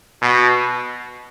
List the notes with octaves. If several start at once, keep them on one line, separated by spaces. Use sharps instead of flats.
B2